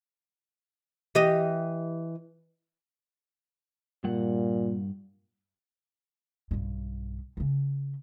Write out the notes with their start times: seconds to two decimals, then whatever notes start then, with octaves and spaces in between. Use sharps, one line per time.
1.15 E3 G4 D#5
4.04 G2 A#2 G3 F#5
6.51 B1 G2
7.37 C#3 C4